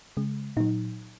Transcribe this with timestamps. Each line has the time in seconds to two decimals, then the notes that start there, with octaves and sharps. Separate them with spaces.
0.17 C#3 G#3
0.57 A#2 F#3 D#4